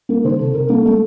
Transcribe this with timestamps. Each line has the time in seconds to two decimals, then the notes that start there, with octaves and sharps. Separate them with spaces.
0.09 A#3 A#4
0.24 D#3 C5
0.39 C3 A4
0.54 C3 A#4
0.70 A#3 A4
0.85 A3 A4